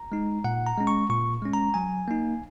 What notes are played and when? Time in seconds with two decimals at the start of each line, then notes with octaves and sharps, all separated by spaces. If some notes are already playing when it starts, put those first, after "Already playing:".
Already playing: A#5
0.12 G#3 D#4
0.44 A#2 F#5
0.67 A#5
0.78 G#3 C#4
0.87 C#6
1.10 A#2 C#6
1.42 G#3 C#4
1.53 A#5
1.74 F#3 G#5
2.08 A#3 D#4